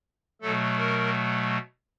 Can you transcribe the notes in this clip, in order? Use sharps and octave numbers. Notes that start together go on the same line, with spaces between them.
B2 F#3 A3 A4
A#4